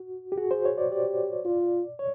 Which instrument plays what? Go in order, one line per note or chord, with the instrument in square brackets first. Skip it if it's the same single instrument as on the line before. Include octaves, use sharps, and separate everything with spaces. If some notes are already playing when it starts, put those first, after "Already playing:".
Already playing: [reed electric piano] F#4
G4
[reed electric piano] F#4 [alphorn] G#4
[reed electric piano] C5
C#5
D5
[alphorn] G4 [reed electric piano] D5
[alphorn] F4
[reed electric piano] C#5